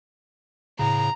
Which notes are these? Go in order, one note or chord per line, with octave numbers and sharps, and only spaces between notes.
A2 C#3 A#5